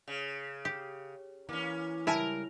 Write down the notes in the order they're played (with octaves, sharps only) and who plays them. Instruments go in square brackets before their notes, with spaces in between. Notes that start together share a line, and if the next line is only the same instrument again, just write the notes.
[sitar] C#3
[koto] G4
[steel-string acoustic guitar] E3 [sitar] A#3 C#4
[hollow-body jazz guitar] C#2 G3 A5 [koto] E4 G#5 [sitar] A#4